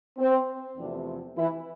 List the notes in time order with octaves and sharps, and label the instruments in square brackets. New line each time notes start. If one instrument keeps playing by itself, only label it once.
[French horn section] C4
E2 C3 F3 A3 D4
E3 E4